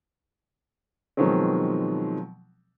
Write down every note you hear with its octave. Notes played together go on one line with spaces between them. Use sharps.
B2 D#3 F3 F#3 G#3 C4